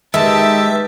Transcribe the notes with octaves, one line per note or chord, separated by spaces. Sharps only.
D#3 G#3 G4 B4 E5 A5